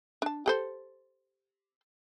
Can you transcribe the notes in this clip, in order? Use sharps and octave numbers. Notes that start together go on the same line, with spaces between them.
D4 A5
G4 A4 C5